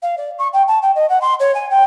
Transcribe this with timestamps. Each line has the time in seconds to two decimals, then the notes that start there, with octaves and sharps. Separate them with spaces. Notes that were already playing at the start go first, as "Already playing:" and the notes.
0.02 F5
0.17 D5
0.38 C#6
0.53 G5
0.67 A5
0.82 G5
0.95 D#5
1.09 F#5
1.21 C6
1.39 C#5
1.54 G#5
1.70 G5